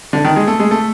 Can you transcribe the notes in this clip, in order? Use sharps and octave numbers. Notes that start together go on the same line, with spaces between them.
D3
D#3
G#3
A3
G#3
A3